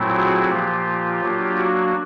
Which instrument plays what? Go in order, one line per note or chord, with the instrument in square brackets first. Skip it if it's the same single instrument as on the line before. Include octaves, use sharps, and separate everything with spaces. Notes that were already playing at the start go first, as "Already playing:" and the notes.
Already playing: [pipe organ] A#2 F#3 A3 C4 E4
F#4 G#4
A#2 F3 A#3 F4 G4
F#3 A#3 D4
F#4